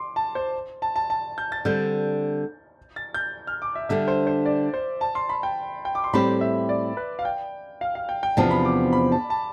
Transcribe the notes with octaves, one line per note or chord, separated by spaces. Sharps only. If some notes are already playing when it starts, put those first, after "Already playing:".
Already playing: C6 D6
A5
C5
A5
A5
A5
G6
A6
D3 G3 C4 G6
A6
G6
F6
D6
E5
D3 G3 D4 E5
C5
C5
D5
C5
A5
C6
B5
G5
G5
D6
C6
A2 G3 C4 G4 B5
E5
D5
B4
F5
G5
F5
F5
G5
G5
E2 C3 F3 B3 D4 A5
B5
D6
B5
A5
A5